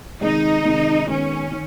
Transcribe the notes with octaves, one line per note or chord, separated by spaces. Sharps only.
C3 D#3 G#3 D#4
C3 D#3 G#3
D#3 G#3 B3 C#4
D#3